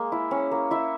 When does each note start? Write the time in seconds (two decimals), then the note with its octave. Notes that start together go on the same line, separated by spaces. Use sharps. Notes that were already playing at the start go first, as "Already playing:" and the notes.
Already playing: G#3 A#3
0.12 E4
0.31 C#4
0.51 A#3
0.71 E4 E5